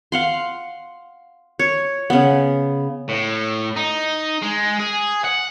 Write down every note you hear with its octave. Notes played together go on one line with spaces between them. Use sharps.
F5 F#5 C6
C#5
C#3 B3
A2
D#4
G#3
G#4
F#5